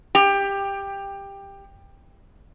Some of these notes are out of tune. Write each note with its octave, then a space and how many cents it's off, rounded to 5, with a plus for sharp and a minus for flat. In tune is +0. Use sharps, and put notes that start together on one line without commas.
G4 +15